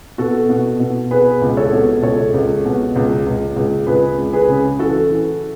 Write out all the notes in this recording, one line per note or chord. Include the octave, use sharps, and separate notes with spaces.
B2 F#4 A4
B2
B2
B2 G#4 B4
C#2
A4 C#5
B2
C#2 A4 C#5
C#2
B2
C#2
C#2
C#2
C#2 G#4 B4
C#2
G#4 B4
C#3
E3 F#4 A4
E3